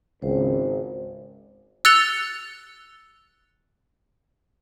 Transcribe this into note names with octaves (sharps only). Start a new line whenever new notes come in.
G#1 C#2 C5
E6 F#6 A6 C#7 F7 G7